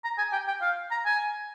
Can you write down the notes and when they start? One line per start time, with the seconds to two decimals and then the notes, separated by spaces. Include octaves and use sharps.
0.04 A#5
0.18 G#5
0.32 G5
0.48 G5
0.61 F5
0.91 A#5
1.06 G#5